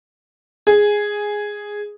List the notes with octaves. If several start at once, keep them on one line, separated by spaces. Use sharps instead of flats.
G#4